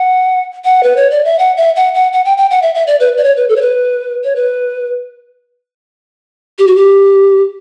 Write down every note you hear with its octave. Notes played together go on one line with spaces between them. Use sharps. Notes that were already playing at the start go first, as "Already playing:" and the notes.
Already playing: F#5
F#5
B4
C#5
D5
E5
F#5
E5
F#5
F#5
F#5
G5
G5
F#5
E5
E5
D5
B4
D5
C#5
B4
A4
C#5
B4
C#5
B4
G4
F#4
G4